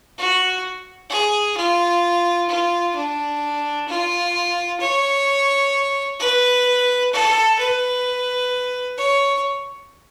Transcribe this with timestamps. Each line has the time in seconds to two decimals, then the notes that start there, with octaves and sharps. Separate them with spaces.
0.18 F#4
1.10 G#4
1.57 F4
2.49 F4
2.95 D4
3.88 F4
4.80 C#5
6.19 B4
7.13 A4
7.59 B4
8.97 C#5